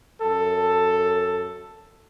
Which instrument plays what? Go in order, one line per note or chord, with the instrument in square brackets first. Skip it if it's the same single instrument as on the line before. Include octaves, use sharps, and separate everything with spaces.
[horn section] F#2 A4